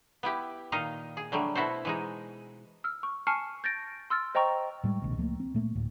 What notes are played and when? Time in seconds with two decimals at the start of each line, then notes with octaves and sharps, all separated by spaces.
0.23 B3 E4 G4
0.72 A#2 D#3 D#4 D#5 F5
1.17 G#4
1.32 D3 F#3 G3 A3
1.55 B2 E4 F#4 A4 C5
1.85 E3 G#3 D#4
2.84 E6 F6
3.03 C#6
3.27 G#5 A5 C#6 F6 C7 C#7
3.64 G6 A6 A#6 D7
4.10 C6 E6 F6 A6
4.35 C5 D#5 G5 A#5 C#6
4.84 A2 G3 G#3
5.02 E1 A#1 D#2 C3
5.17 C#2 F3 A3 A#3
5.40 C4
5.54 A#2 A3 A#3
5.75 D1 D2 A2